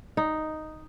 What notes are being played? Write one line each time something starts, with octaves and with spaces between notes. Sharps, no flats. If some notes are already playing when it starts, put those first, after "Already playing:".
D#4